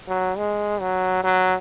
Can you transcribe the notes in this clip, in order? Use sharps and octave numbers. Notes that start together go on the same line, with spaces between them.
F#3
G#3
F#3
F#3